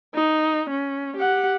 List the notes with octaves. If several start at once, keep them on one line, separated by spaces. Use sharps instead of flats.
D#4
C#4
G4 F#5